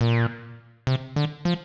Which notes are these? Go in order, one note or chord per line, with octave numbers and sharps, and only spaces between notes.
A#2
C3
D3
F3